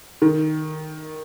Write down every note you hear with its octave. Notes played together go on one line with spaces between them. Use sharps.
D#3